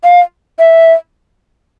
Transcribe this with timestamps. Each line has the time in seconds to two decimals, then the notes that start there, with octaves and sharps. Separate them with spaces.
0.04 F5
0.59 E5